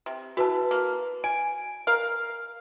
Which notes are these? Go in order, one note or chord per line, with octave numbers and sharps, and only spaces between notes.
C3
E3 F#4 B4 A5
A#3
G#5 D7
A#4 F5